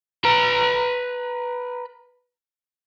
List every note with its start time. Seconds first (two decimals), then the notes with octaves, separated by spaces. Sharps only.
0.25 B4 A#5